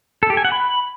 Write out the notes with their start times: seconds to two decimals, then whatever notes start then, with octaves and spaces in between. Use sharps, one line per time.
0.23 A4
0.30 G4
0.37 G#5
0.45 F#5
0.52 B5